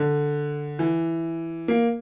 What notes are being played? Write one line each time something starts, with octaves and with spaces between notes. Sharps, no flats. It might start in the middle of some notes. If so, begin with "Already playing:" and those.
Already playing: D3
E3
A#3